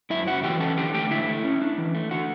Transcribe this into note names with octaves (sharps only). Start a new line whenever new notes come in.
F#2 E4 E5
C#3 F#4 F#5
E3 G4 G5
C#4 A4 A5
D3 G4 G5
A3 G4 G5
D3 E4 E5
A3
C#4
D4
E3
A3
D3 F#4 F#5